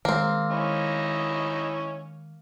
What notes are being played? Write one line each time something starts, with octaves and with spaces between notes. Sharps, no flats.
D#3 G#3 A#3 C4
C#4 D#4 E4